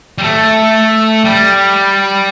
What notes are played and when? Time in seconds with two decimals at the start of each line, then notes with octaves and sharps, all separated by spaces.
0.18 G3
0.23 A3
1.24 G3